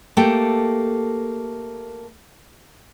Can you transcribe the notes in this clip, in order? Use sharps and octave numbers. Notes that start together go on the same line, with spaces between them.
A3 A#3 G4 A4 G5